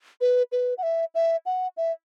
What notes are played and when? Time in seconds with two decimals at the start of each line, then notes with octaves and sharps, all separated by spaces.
0.21 B4
0.52 B4
0.78 F#5
0.83 E5
1.15 E5
1.46 F#5
1.77 E5